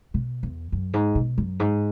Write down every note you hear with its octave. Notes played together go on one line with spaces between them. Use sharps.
B2
E2
F#2
G#2
B2
F#2
G#2